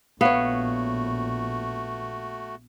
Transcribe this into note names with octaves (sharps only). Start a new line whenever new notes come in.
A#1 A3 B3 F#4 C#5 F5